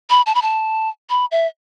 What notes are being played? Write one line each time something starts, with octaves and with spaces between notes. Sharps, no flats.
B5
A5
B5
A5
B5
E5